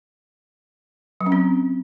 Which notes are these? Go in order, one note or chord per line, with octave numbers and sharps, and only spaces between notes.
F#3
C#4
C4